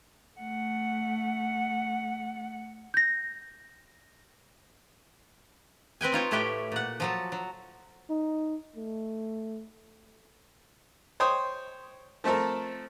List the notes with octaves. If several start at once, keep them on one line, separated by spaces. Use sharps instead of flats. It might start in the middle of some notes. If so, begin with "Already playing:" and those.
A3 F#5
G6 A#6
C4 B4 G5 G#5
D#4 F4 C#5 G5
A2 A3 E4 G4 B4 G5
A#2 F#5
F3 F#3 A4
F#3
D#4
A3
C5 C#5 G5 C6 D#6
F3 A3 C4 A4 A#4